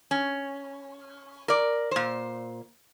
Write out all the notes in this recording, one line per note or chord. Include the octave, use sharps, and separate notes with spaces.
C#4
A#4 D5
A#2 C5